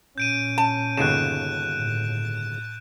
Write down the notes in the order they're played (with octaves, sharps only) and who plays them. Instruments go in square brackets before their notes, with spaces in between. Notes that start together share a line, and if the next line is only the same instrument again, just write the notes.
[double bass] A#2 C#4 [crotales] G6 D7 D#7
[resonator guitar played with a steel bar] A5
[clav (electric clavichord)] G1 D#2 C#3 [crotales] F#6 D7 E7
[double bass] A2